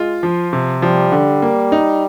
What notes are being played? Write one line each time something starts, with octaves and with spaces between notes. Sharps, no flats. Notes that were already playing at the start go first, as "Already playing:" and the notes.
Already playing: G#3 F4
F3
C3
F3 G3
D3
A#3
D#4